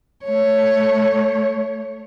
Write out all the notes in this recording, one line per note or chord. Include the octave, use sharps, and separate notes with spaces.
A3 C#5